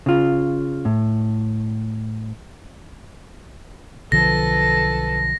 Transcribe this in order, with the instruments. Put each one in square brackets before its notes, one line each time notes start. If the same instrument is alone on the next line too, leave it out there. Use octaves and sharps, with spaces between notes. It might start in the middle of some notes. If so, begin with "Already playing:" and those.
[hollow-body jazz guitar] C#3 F4
A2
[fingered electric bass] B1 D3 F3 [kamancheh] A4 B4 [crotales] A#6